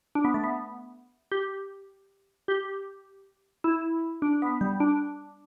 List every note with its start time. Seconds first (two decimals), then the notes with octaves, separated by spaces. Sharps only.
0.15 D4
0.25 B3
0.34 A3
0.44 B3
1.32 G4
2.48 G4
3.64 E4
4.22 D4
4.42 B3
4.61 G3
4.80 D4